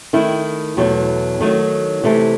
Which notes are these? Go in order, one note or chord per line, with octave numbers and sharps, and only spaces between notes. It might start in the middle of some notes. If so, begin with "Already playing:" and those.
D#3 A3 E4
E2 B2 F#3 A3
D#3 F#3 A3
C3 E3 A3